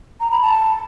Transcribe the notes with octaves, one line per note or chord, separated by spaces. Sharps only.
A#5
B5
A5